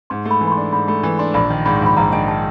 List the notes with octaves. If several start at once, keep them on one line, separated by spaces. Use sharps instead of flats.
G#2 C6
A3
B5
E3
B5
C6
D4
G#2 B5
A3 B5
E3
D4 C6
A#1 B5
D#3
G#2 B5
C6
A#1 B5
A#1 A#5
D#3 G#5
A5